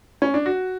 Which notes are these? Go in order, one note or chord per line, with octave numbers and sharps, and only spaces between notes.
C#4
D4
F#4